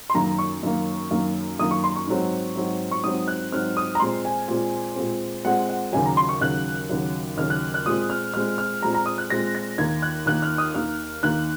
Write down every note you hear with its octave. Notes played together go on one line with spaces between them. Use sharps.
C6
F#2 D#3 A#3 A#5
C#6
F#2 D#3 A#3
F#2 D#3 A#3
F#2 D#3 A#3 D#6
C#6
C6
C#6
G#2 F#3 C4
G#2 F#3 C4
C#6
G#2 F#3 C4 D#6
F#6
G#2 F#3 C4 F6
D#6
A#5
A#2 G#3 C4 C6
G#5
A#2 G#3 C4
A#2 G#3 C4
A#2 G#3 C4 F#5
F#5
D#2 C#3 F#3 G#5
A#5
C6
C#6
D#2 C#3 F#3 F#6
D#2 C#3 F#3
D#2 C#3 F#3 F6
F#6
F#6
A#2 G#3 C4 D#6
F6
A#2 G#3 C4 F6
F6
A#2 G#3 C4 A#5
A#5
D#6
F#6
A#2 G#3 C4 A#6
A#6
D#2 D#3 A#3 G#6
F#6
D#2 D#3 A#3 F#6
F6
D#6
D#2 D#3 A#3 F6
D#2 D#3 A#3 F#6